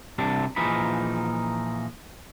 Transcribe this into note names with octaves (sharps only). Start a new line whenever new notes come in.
C3 G3 C4 D4
A#2 E3 F3 D#4 G#4 B5